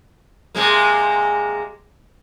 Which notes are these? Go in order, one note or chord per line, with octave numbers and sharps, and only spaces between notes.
C3 G#3 A#3